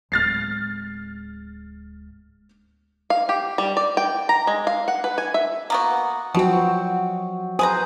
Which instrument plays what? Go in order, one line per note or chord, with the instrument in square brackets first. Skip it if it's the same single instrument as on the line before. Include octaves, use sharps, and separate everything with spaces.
[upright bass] D1 G#3 [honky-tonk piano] F6 A6 C7
[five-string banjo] F5
G4
G3
D5
G5
A#5
G#3
F5
F#5
B4
G#5
E5
[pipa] A#3 B3 F#4
[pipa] B2 C4 [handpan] F3 F#3 F#4
[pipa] G#4 B4 A#5 [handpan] C5